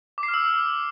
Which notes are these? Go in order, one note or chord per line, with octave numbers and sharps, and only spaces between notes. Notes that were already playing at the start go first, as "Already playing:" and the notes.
D6
C7
F6
E6